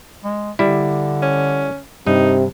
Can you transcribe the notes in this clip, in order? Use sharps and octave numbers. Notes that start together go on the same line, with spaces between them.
G#3
D3 G3 E4
C#4
G2 C3 D#4